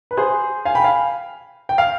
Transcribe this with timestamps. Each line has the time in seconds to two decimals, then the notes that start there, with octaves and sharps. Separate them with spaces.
0.11 B4
0.17 G#4 C5
0.65 F5 G#5
0.75 G5 B5
0.84 F5 G#5
1.69 G5
1.78 F5